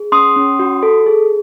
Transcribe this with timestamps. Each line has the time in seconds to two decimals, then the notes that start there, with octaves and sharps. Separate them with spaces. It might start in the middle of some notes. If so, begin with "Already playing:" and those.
Already playing: G#4
0.12 C#4 C6 D#6
0.36 C#4
0.59 F#4
0.83 A4
1.06 G#4